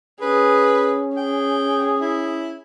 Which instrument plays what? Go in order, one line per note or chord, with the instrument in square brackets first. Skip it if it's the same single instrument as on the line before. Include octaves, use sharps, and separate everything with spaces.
[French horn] C#4 [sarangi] G#4 [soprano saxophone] B4
[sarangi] G#4 [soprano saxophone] G5
[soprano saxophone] E4